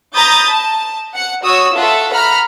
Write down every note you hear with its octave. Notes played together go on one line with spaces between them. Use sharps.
A#5 B5 D#6 G6 A6
A5
F#5 C#7
F#4 C#5 D#6 E6
F4 A4 E5 F#5
F#5 A#5 B5 F6